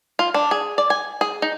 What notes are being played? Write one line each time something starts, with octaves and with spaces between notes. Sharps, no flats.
F4
D4
G#4
D5
G#5
G#4
D#4